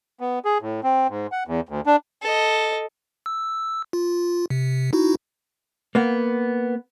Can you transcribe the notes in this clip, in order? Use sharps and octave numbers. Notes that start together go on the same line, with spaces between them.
B3
G#4
A2
C4
G#2
F#5
E2
D2
D4
A4 D#5
E6
F4
C3
D#4 E4 F#4
A#3 B3